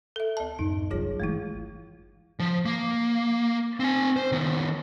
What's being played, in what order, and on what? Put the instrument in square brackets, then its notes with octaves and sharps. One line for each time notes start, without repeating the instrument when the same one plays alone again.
[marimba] A4 E5
D2 A5
[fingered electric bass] D1 F#2 D4 [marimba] D#4
[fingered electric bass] G1 C2 F#3 [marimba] F4 G#4 C#5
[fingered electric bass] G1 E3 [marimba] G#3 A3 E4
[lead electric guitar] F3
A#3
C4 G#5
C5
D#3 B3